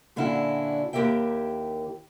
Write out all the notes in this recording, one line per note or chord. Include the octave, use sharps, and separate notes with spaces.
A#2 D3 C#4 D4 E4 F#4
D#2 E4 G4 A#4 E5 G5